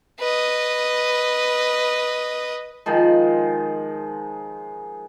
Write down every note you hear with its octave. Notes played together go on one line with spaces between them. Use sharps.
B4 D#5
D#3 F3 G#3